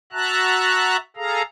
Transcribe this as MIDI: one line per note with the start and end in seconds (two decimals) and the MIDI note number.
0.12 0.97 66
0.12 0.97 76
0.12 0.97 81
0.12 0.97 82
0.12 0.97 90
1.17 1.42 68
1.17 1.42 69
1.17 1.42 77
1.17 1.42 82